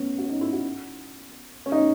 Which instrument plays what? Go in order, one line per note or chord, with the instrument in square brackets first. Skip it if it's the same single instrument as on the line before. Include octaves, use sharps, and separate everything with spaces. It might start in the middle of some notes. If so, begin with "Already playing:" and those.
Already playing: [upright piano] B3 C#4
F#4
C#4
D#4
E4
F#4
C#4
D#4